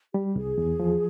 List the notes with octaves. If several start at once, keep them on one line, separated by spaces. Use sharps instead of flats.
G3 G4
G4
C2 G#4
E2
F3